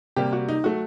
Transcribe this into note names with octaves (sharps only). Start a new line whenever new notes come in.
C3 G3 A#3 G4
F#4
D#4
F#3 A3 F#4